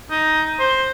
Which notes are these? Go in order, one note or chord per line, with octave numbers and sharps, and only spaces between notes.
D#4
C5